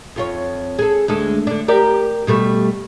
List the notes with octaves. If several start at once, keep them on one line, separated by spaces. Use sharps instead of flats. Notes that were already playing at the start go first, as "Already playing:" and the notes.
F2 F4 C#5
G#4 A4
D2 G#3 A4
D3 D4
G4 A#4 D5
B2 G3 A3